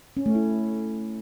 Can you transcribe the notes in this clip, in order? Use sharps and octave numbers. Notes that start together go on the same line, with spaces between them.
C#4
A3
E4